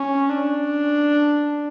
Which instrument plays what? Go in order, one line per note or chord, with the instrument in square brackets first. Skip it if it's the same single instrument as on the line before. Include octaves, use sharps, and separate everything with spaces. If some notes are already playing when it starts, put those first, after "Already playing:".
Already playing: [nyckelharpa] C#4
D4